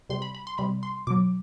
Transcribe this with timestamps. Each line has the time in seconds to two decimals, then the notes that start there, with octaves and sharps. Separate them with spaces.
0.10 C3 G3 C6
0.22 B5
0.35 B5
0.47 C6
0.58 C3 G3 B5
0.83 C6
1.07 B2 F#3 D6